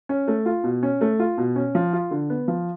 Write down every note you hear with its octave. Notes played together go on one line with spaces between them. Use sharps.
C#4
A3
F4
B2
C#4
A3
F4
B2
C#4
F3
F4
D3
B3
F3